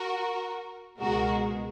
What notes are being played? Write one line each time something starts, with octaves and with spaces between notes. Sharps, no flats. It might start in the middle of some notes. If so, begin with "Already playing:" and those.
Already playing: F#4 A#4
C#2 B2 G#3 F#4 A#4